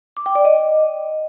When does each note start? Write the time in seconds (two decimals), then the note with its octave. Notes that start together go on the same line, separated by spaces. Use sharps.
0.17 D6
0.26 G5
0.35 D5
0.45 D#5